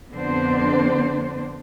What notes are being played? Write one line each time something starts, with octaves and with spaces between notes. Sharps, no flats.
F2 D3 B3 C4 D4 C5